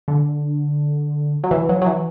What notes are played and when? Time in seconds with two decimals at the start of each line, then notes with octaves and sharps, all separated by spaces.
0.08 D3
1.44 F#3
1.51 E3
1.69 F#3
1.82 F#3
1.86 E3